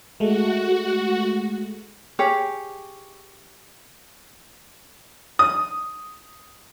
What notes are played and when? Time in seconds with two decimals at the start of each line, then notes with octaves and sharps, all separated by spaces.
0.20 G#3 A3 F#4
2.19 G4 G#4 C#5
5.39 D#6